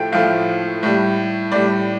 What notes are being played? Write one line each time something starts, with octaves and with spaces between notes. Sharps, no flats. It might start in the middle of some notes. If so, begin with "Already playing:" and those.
Already playing: A2 F3 A3 G5
A2 F3 A3 F5
A2 G3
A2 G3 D5